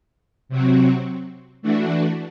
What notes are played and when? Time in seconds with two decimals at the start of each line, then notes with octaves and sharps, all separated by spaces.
0.49 C3 F#3 C4 F#4
1.62 E3 A3 D4 F#4